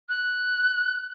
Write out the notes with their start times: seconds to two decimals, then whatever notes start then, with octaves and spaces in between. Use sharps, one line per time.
0.09 F#6